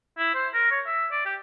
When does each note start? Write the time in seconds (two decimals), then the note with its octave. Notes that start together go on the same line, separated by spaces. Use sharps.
0.18 E4
0.35 C5
0.54 A#4
0.71 C#5
0.86 E5
1.12 D5
1.26 G4